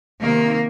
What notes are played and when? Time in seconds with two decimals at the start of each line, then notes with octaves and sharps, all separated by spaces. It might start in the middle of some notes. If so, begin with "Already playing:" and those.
0.21 C3 D#3 A#3